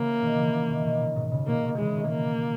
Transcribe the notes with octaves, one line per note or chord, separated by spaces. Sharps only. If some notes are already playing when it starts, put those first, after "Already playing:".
Already playing: C#3 E3 A#3
B2 D#3
C#3 E3
C#3 E3
B2 D#3
B2 D#3
A#2 C#3
G#2 B2
A#2 C#3
B2 D#3 A#3
B2 D#3
C#3 E3 G#3
B2 D#3
A#3